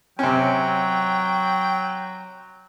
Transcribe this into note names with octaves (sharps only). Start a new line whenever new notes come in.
C3 F#3 C#4 G5